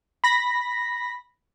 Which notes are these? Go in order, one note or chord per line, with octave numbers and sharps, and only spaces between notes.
B5 A#6 B6